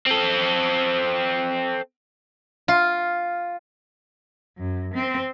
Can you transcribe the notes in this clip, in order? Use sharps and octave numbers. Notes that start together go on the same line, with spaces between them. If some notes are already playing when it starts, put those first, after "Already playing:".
C4 A4
F4
F#2
C4